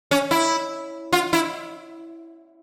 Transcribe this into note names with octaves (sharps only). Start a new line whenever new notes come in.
C#4
E4
F4
E4